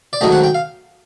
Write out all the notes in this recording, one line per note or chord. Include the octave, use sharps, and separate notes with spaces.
D5
G#2 D#3 F#3 A3 C4 D#5
F#5
G5
F5